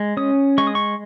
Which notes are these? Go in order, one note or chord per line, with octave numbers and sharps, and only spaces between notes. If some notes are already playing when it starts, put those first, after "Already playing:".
Already playing: G#3
C#4 D#6
G#3 C#6
D#6
C#6